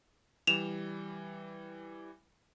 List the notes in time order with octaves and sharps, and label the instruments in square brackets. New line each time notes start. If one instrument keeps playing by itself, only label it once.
[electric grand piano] E3 G3 [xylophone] E7 F7